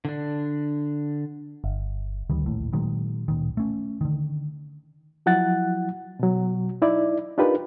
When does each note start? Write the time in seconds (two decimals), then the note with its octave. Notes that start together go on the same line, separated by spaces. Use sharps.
0.05 D3 D4
1.64 G1
2.30 D2 D#3 G3
2.46 A#1 D#2 A2
2.73 A#2 D#3 F#3 G#3
3.28 D1 A#2 D#3
3.57 A3 C#4
4.01 D3 D#3
5.26 F3 F#3 E4 F#5 F#6 A6
6.19 B2 F#3
6.82 D#4 E4 D5
7.38 D4 D#4 F4 G4 A#4 B4